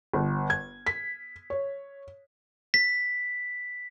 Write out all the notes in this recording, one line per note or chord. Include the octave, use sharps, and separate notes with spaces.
G1
G#6
B6
C#5
B6